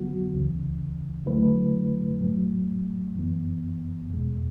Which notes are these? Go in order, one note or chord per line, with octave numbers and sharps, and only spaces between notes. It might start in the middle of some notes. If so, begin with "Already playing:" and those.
Already playing: D3 F#3 B3 F#4
C#2 C#3 E3
D3 F#3 A3 E4 B4
A2 F#3 A3
F#2 E3 B3
E2 B2 G#3